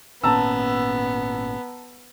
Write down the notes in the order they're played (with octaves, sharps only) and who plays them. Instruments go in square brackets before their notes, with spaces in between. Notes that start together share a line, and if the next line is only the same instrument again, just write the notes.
[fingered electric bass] G#1 A#2 C#4 [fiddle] B3 [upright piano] A5 A#5 E6